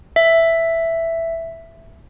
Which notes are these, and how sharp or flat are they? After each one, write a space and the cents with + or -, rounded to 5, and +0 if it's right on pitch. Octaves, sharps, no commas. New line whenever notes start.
E5 +5